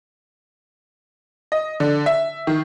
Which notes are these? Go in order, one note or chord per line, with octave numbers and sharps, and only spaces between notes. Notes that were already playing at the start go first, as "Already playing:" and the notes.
D#5
D3
E5
D#3